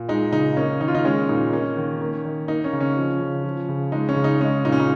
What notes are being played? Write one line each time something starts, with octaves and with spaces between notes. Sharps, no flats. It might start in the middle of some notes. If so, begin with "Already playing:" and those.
Already playing: A#2
G#3 D#4
C#3 D#4
A#3 C#4
D#3 D#4
F4
D#4
G#3 C#4
A#2 D#4
A#3 C#4
D#3
A#3
D#3
A#3 D#4
C#4
C#3
C#4
F3
C#3
F3
C#3
G#3 D#4
C#4
C#3
D#4
G#3 C#4
A#2 D#4
C#4
D#4